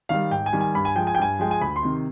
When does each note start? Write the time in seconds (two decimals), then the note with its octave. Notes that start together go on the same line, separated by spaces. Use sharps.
0.09 D#3 G3 F5
0.31 G#2 G5
0.46 G#5
0.53 D#3 G3
0.61 G#5
0.74 G2 B5
0.85 G#5
0.96 F3 G#3 G5
1.07 G#5
1.15 G5
1.18 G2 G#5
1.39 F3 G#3 G5
1.51 G#5
1.61 D2 B5
1.76 C6
1.83 C3 D#3